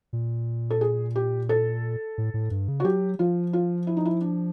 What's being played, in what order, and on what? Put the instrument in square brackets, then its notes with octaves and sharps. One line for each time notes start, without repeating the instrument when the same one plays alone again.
[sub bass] A#2
[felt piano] A4
G#4
G4
A4
[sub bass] A2
A2
G2
C#3
[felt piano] F#4
[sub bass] F#3 [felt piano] G4
[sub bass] F3 [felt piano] F4
[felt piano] F4
E4
D#4
E4
D4